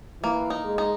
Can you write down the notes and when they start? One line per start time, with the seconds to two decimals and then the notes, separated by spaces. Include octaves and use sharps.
0.23 E3 A#3
0.50 D#4
0.65 G#3
0.78 D#4